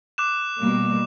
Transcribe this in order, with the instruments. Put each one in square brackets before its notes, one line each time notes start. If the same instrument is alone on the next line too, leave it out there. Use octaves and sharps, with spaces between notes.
[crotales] D6 F#6 E7
[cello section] B2 G3 A#3